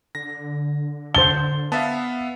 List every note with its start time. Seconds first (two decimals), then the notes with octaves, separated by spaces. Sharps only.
0.15 D3 A#6
1.15 C5 A5 G7
1.72 B3 E5 F5 A5